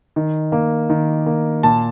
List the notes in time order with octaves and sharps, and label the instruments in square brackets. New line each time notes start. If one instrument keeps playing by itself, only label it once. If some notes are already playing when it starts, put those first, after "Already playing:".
[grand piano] D#3
A#3
D#3
A#3
A#2 A5